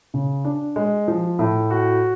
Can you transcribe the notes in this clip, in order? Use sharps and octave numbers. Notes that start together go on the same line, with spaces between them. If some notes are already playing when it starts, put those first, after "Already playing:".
C#3
D4
G#3
F3
A2
F#4